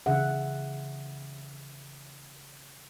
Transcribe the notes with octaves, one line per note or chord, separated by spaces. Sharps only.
C#3 E3 D4 G#4 E5 F#5